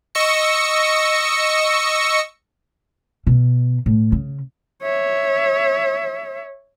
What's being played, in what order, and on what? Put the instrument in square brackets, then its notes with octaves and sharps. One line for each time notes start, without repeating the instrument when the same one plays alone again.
[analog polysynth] D#5 C#6 E6 A#6 C#7
[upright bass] B2
A2
C#3
[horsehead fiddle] C#5 E5